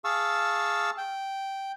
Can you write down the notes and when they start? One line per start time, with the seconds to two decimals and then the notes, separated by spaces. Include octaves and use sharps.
0.05 G#4 F5 A5 C#6 E6
0.98 G5